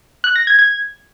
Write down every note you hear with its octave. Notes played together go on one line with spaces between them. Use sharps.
F#6
A#6
G#6
G#6